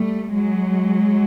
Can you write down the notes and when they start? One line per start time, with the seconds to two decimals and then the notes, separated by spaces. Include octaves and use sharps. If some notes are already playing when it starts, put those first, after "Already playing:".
Already playing: G3 A3
0.35 F#3 G#3